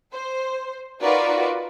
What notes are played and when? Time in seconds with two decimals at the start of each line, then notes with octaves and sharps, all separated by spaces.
0.14 C5
1.02 D#4 F4 F#4 A#4 B4 D5